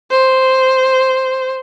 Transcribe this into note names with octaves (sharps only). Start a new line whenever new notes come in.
C5